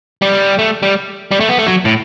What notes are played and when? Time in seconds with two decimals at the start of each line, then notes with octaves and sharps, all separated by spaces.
0.22 G3
0.59 A3
0.83 G3
1.31 G3
1.40 A3
1.49 B3
1.58 A3
1.67 F#3
1.85 A2